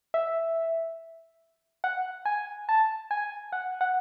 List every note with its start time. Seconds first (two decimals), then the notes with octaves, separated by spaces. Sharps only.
0.14 E5
1.84 F#5
2.25 G#5
2.69 A5
3.11 G#5
3.53 F#5
3.81 F#5